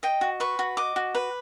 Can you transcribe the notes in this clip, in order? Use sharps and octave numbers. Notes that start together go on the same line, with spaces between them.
D#5 G5
F#4
B4 C#6
F#4
D#5 D6
F#4
B4